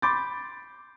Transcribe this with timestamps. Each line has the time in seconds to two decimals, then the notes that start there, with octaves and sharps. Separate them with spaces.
0.02 B5 C6 D6 G6 A6